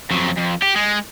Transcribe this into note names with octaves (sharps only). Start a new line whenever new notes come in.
F2 F#3
F2
G4
G#3